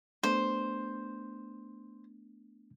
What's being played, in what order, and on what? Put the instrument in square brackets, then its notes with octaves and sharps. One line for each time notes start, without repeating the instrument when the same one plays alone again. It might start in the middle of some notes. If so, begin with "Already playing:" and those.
[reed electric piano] A3 B3 D4 [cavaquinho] C5